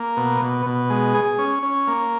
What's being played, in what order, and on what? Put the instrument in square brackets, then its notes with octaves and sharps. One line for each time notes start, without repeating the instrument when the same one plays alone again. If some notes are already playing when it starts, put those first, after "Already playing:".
Already playing: [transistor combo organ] A#3
B2
B2
B2
G#3
G#4
C#4
C#4
A#3